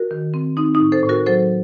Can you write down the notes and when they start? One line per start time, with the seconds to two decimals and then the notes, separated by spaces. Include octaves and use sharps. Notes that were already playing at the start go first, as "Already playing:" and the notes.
Already playing: F#4 A#4
0.11 D#3
0.34 C4
0.57 C4 D#4
0.75 D#4
0.80 A2
0.92 A4 C5
1.03 A2
1.09 F#4 A#4
1.26 F#3 A4 C5